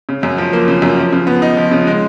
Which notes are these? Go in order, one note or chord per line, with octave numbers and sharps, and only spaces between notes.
C#3
F#2
F3
A#3
C#3
F#2
F3
C#3
B3
D#4
F3
C#3
G#3